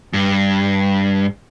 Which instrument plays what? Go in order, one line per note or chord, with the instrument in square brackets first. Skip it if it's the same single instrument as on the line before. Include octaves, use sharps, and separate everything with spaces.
[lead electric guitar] G2